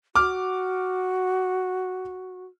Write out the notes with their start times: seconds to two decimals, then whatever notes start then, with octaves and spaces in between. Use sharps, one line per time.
0.15 F#4 D6 F6